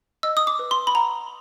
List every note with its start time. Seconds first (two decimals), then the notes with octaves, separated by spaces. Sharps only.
0.23 D#5 E6
0.37 D#6
0.47 D6
0.59 B4
0.71 C6
0.87 B5
0.95 F#5 A#5